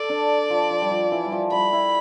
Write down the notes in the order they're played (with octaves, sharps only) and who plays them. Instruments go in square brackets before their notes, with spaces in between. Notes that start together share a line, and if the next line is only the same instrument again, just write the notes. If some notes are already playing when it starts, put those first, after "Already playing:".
Already playing: [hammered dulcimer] A4 [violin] D5
[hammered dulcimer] D4
F3
F3
G3
F3
E3
G3
F3
[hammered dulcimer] G3 [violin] B5
[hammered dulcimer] E4